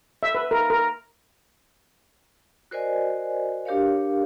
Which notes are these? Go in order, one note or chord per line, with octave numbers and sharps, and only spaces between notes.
E5
B4
A#4
A#4
F#4 A#4 C5 D5 D#5 G#5
D4 G4 A#4 C#5 F5